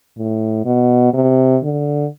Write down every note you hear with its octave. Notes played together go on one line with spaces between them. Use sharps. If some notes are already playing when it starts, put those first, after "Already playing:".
A2
B2
C3
D3